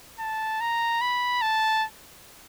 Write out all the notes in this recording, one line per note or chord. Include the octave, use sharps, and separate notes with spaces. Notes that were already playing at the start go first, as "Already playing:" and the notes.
A5
A#5
B5
A5